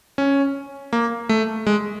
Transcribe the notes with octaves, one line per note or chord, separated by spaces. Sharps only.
C#4
A#3
A3
G#3